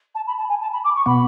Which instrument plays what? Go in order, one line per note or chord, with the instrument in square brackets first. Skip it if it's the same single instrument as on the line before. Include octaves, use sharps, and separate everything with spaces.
[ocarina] A5
B5
A5
G#5
A5
B5
D6
C#6
[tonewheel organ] B2 B3 [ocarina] B5